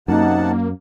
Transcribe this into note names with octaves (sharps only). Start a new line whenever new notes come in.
F#2 C3 A#3 D#4 F#5 A5